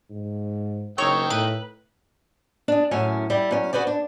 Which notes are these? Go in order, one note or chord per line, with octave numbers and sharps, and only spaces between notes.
G#2
F#1 D#3 C#5 G5 E6
A2 B4
D4 G#4
F#2 A2 C#4 G#5
G3 E4 G4
F#2 C#4
F#4 G#4 B4 C5 D5
D4